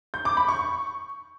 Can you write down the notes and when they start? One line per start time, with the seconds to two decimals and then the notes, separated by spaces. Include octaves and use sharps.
0.14 G6
0.25 D6
0.37 B5
0.49 C#6